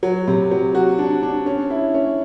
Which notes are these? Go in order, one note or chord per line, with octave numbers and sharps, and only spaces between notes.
F#3
C3
F#3
F#4
D4
D4
C#4
E4
C#4